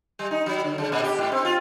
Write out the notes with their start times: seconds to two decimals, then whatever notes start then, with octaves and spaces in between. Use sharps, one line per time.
0.19 G3
0.31 D#4
0.46 F#3
0.64 D3
0.78 C#3
0.92 A#2
1.04 G4
1.18 G#2
1.32 C4
1.45 F4